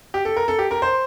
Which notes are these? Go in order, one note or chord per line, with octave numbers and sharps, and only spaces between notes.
G4
A4
A#4
A4
G4
A#4
C5